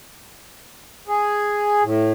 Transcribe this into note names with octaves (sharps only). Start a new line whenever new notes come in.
G#4
A2